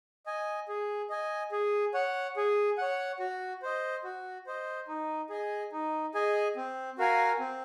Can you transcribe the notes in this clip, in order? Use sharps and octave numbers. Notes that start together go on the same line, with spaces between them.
D#5 G#5
G#4
D#5 G#5
G#4
C#5 F#5
G#4
C#5 F#5
F#4
C5 D#5
F#4
C5 D#5
D#4
G#4 D#5 G#5
D#4
G#4 D#5 G#5
C4
F#4 A#4 F5 G#5
C4